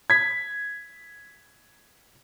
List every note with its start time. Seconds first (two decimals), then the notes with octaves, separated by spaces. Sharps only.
0.10 G#6 B6